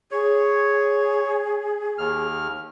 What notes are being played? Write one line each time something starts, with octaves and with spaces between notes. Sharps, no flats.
G#4 C#5
D#2 F6